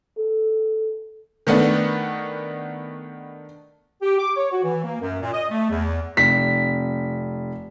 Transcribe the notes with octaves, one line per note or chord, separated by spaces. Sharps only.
A4
D#3 A3 B3 D4
G4
D6
C#5
F#4
E3
A#3
F#2
A#2
D#5
A3
E2
F1 B6